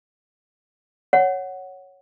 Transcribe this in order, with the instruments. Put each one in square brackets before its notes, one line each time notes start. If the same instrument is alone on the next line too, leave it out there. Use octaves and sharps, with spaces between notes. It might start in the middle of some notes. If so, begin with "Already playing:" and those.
[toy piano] C#5 F#5